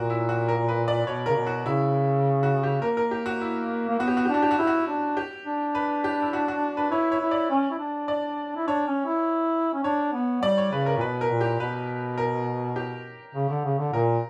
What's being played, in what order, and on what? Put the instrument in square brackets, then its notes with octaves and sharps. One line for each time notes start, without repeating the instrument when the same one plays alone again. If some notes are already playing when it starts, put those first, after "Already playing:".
Already playing: [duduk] A#2 [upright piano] F#4 A#4
[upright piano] E4
F#4
A#4
B4
D5
[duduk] B2 [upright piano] C#5
[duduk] C#3 [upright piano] A#4
[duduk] B2
[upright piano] F#4
[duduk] C#3 [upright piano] E4
[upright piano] F#4
G4
[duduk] A#3 [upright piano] A#4
[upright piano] A#4
G4
F#4
E4
[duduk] A#3
[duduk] B3 [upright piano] F#4
[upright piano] G4
F#4
G4
[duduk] D4 [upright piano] F#4
[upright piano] G4
F#4
[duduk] E4 [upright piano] G4
[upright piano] F#4
[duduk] D4
[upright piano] G4
[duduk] D4
[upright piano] B4
G4
E4
F#4
F#4
B4
[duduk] E4 [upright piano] C#5
[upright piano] C#5
[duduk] E4
[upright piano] D5
[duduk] C#4
E4
D4
[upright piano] D5
[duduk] E4
[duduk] D4 [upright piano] C#5
[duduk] C#4
E4
C#4
[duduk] D4 [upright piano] C#5
[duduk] B3
[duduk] G3 [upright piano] D5
[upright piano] C#5
[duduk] C#3 [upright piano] B4
[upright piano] A#4
[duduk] A#2
[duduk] B2 [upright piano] B4
[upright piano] A#4
[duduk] A#2
[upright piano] G4
[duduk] B2 [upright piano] B4
[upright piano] A#4
G4
[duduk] C#3
D3
C#3
D3
[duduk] A#2 [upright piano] A#4